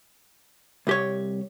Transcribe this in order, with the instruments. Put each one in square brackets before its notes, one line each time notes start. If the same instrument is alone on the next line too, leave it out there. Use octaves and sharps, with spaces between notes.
[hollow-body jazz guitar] C2 G4 C#5